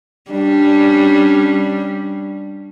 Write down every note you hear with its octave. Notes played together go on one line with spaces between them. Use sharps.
G3 C#4 D4